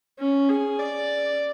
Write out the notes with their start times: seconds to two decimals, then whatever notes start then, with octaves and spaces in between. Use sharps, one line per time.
0.19 C#4
0.49 G#4
0.79 D5